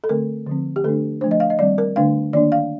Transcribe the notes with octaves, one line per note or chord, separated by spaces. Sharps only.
A4
D3 A3 C4 A#4
D3 F3 C4
G4
D3 A3 D4 A4
F3 A3 D4 C5
D#5
F5
D#5
D#3 G3 C4 D5
A#4
D3 A3 D4 F5
D#3 A#3 D4 D5
F5